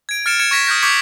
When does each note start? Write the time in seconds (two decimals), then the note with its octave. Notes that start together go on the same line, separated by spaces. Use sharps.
0.09 G#6 D7
0.26 F6 A6 C#7 D7 E7
0.40 G#6 C#7 E7
0.51 C#6 G#6 A#6 B6 E7
0.67 D#6 F6 G6 A#6
0.83 C#6 D6 G6 G#6 B6 C#7